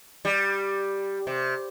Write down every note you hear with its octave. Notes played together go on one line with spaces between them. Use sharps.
G3
C3